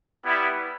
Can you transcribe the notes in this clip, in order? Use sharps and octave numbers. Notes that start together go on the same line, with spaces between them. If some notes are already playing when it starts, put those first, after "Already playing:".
G3 B3 E4